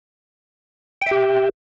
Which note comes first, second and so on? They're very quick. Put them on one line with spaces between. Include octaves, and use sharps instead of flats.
G5 E5 G4